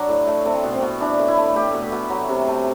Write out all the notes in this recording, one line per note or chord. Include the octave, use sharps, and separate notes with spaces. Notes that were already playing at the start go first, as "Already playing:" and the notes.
Already playing: F#3 D4
A2
A3
A3 C4
B2
C4
B2
E3 D4
A2
E4
A3
A3 G4
B2
B2
F#3
C3
A3